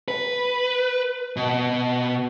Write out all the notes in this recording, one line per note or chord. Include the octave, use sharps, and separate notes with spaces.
B4
B2